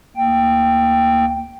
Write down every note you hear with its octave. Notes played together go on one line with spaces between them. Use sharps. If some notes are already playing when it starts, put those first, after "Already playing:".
D2 A#3 G5